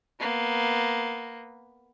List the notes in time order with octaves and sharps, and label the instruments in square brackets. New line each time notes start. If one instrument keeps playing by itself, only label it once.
[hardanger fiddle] A#3 B3